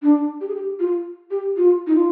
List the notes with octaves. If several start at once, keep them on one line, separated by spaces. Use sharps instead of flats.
D4
G4
G#4
G4
F4
G4
F4
D#4
F4